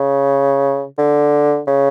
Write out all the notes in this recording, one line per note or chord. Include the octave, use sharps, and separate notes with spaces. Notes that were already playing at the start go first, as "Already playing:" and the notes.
Already playing: C#3
D3
C#3